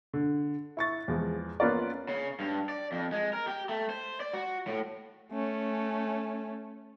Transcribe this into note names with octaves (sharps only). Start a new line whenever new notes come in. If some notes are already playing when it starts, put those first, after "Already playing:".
D3
E4 C#6 A6
E2 F3 G#3
A#3 B3 C#4 F4 A#4 D5
C#3
G2
D5
F2
G#3
A#4
G4
A3
C5
D5
F#4
A2
A3 C#4